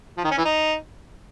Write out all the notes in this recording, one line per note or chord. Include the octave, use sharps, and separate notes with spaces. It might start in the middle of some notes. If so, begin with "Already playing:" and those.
F3
D#3
C#4
E3
D#4